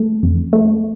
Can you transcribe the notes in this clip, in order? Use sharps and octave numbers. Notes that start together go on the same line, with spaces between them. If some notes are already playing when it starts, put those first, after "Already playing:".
Already playing: A3
F2
A3